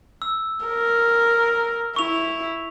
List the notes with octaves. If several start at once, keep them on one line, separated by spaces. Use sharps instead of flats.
E6
A#4
E4 C#6 F7